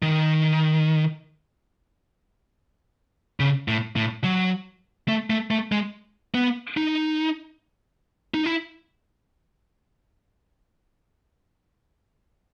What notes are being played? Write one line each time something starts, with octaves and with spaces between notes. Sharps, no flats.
D#3
C#3
A2
A2
F#3
A3
A3
A3
G#3
B3
D#4
D#4
E4